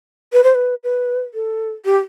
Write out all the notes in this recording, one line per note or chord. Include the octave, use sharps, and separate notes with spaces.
B4
C5
B4
B4
A4
G4